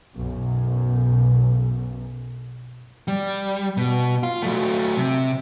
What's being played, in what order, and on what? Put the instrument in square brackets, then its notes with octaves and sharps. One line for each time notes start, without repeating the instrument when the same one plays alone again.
[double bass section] B1 F#2
[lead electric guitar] G3
B2
F4
F#3 A3
C3